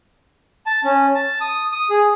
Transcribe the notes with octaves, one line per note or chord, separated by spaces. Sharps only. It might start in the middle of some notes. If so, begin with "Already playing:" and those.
A5
C#4
A5
D#6
D#6
G#4